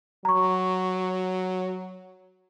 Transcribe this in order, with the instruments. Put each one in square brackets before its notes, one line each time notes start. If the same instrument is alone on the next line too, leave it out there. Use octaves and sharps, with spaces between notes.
[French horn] F#3 [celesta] A#5 C#6